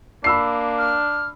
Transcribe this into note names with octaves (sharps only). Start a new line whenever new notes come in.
A#3 D4 B5 E6 C7
F6